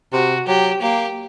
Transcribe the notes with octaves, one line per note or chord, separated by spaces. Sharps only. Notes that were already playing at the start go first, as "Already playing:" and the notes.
C3 F#4
F#3 G4
A#3 G4